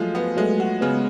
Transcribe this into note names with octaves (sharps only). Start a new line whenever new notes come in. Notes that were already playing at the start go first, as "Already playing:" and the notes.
Already playing: F3 F#3 G#3 A3 F4
B3
F#3 G#3 A3
F#4
C#3 G#3 B3